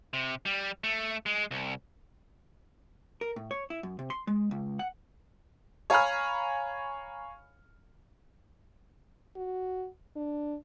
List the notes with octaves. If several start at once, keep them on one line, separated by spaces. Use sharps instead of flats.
C3
G3
A3
G#3
C2
A#4
A2
C#5
E4
F#2
C3
C6
G#3
C#2
F#5
C#5 F5 G#5 A#5 B5 F6
F#4
D4